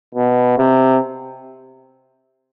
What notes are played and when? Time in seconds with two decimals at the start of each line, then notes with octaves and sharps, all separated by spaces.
0.14 B2
0.58 C3